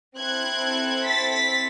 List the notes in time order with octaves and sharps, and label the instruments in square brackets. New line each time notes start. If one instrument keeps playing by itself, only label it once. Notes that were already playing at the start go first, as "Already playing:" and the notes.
[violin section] C4 E4 A4 F#6 G#6
A6 B6
A6 B6